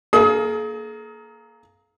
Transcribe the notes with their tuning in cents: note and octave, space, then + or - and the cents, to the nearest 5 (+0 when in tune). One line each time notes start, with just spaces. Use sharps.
A#3 +0 G#4 +45 D#6 +35